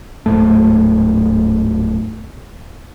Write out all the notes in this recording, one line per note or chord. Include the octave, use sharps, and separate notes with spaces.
D1 G1 G#2 A3